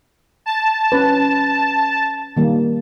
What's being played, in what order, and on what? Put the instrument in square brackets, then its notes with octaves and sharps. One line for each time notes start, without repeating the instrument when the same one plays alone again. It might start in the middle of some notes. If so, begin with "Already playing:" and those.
[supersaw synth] A5
[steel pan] C#4 B4
D#3 G3 A#3